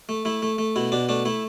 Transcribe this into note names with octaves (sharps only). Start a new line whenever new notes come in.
A3
A3 E4
A3
A3
B2 E4
B2 D4
A3 D4
A3 E4